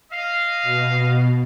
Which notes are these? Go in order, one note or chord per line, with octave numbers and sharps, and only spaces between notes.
D#5 F5
B2